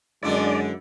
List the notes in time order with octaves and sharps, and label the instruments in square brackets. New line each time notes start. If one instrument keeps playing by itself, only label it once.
[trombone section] F#2 G#3 [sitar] D3 D4 E4 [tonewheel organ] D5